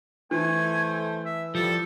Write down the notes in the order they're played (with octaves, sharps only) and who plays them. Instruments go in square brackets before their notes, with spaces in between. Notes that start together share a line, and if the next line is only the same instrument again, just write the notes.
[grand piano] E3 [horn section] A3 C5 [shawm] G#5
[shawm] E5
[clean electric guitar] F3 [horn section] G3 [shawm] A4